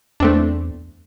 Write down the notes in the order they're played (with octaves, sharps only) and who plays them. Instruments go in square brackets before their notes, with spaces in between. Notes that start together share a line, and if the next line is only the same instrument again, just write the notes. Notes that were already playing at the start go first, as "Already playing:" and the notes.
[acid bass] E2 [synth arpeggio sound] A3 C4 D4